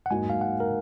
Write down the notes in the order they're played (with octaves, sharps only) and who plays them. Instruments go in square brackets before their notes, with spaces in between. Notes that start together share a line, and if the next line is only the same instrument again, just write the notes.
[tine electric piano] F#5
[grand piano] G#2 F#3 A#3 D#4 F#4 [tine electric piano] G#5
[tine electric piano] F5
F#5
A#4